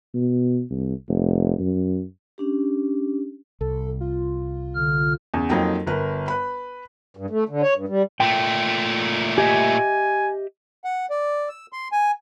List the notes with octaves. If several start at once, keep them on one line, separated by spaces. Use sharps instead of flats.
B2
C2
F1
F#2
C#4 D4 G4
C2 A4
F4
D3 F6
E2 C#3
F2 F#3 A#3 D#4 G5
G1 A#4 B4
B4 B5
G2
A3
D3
C#5
G2
G3
A#2 A3 G5
G4 D#5 E5 G#5
F#5
D5
E6
C6
G#5